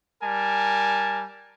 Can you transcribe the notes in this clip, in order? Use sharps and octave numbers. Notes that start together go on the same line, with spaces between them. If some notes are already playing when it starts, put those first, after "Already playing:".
G3 A#4 G#5 A5